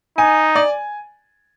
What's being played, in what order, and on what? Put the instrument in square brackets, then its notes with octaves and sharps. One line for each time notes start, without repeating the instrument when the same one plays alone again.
[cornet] D#4 [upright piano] G#5
[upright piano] D5